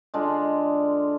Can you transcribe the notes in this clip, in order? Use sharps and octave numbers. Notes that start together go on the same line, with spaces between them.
D3 G#3 D4 F4